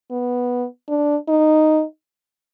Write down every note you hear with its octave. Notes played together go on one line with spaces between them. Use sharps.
B3
D4
D#4